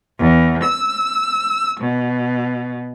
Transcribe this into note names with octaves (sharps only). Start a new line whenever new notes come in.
E2
E6
B2